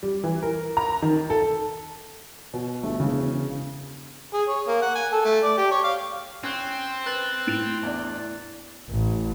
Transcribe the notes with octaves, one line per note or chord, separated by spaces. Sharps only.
G3
E3
A#4
A#5
D#3
A4
B2
G1 A3
E1 C#3
G#4
C#5
A#3
F#5
G#5
A4
A3
D5
G4
C#5
F5
C4 C#4 F#6
B4 F#6 A6 F#7
A2 A6 D7 F7
E2 D4
A1